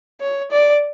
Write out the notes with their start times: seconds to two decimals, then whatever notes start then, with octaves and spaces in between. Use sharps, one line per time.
0.21 C#5
0.51 D5